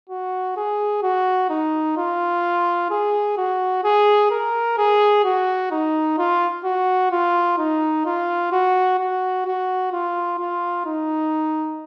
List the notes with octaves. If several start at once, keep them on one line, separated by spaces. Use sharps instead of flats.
F#4
G#4
F#4
D#4
F4
G#4
F#4
G#4
A#4
G#4
F#4
D#4
F4
F#4
F4
D#4
F4
F#4
F#4
F#4
F4
F4
D#4